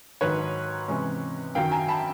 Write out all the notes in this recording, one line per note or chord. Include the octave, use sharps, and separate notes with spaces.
G#2 D#3 F#3 B4 C#5
C3 E3 G#3 C#4
F#2 D#3 F#3 F5 G5
G#5 A#5
A5 B5